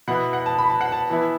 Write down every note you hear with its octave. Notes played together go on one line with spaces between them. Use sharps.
B2 B3 E4 F#5
F#5
A5
B5
A5
F#5
A5
E3 B3 E4